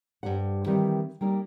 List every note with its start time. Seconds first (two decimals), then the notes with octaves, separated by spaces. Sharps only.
0.23 G2 F3 G3 C5 F#5
0.66 D#3 E3 G3 C4
1.21 G3 A#3 D#4